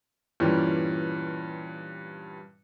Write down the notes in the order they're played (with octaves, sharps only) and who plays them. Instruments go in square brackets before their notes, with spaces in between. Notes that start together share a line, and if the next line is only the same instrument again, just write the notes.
[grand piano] G2 A#2 E3 G3 C#4